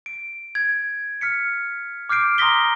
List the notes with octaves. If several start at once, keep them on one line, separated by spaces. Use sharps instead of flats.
D7
G#6
F6 B6 C#7
D6 F6 G6 C7 D7
A#5 C6 D#6 A#6 B6 G7